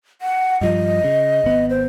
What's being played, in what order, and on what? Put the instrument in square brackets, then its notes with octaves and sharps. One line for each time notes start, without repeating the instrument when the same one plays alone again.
[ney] F#5
[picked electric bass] G2 F3 [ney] D#5
[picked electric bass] C#3
G#1 B3
[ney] C5